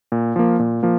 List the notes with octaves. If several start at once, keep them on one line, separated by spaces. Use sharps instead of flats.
A#2
F3 A#3
A#2
F3 A#3